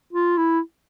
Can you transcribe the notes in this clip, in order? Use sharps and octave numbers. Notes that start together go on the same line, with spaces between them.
F4
E4